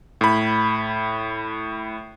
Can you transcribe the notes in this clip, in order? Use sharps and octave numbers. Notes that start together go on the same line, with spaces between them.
A2 B5